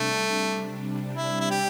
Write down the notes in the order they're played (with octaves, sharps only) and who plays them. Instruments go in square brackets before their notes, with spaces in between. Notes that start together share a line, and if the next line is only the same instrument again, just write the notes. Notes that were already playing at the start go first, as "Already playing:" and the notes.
Already playing: [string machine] C3 G3 D4 [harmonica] A3
[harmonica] E4
E4
G4